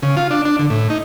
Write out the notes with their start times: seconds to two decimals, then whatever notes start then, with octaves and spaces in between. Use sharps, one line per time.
0.02 C#3
0.17 F4
0.31 D4
0.45 D4
0.59 D3
0.70 A2
0.90 D#4